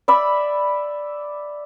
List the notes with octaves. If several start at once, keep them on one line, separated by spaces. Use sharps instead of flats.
D5 E5 B5